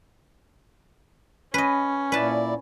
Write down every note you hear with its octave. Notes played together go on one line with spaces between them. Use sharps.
C#4 B4 D#5
A#2 E4 B4 D5 A5